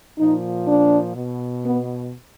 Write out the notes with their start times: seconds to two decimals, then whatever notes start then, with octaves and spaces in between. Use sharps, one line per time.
0.18 A#2 F3 D#4
0.68 D4
1.15 B2
1.65 B3